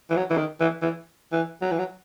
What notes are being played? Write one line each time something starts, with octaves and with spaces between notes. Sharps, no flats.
E3
F#3
E3
D#3
E3
E3
E3
F#3
E3
F#3